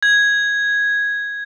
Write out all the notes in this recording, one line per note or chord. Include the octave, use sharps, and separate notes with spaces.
G#6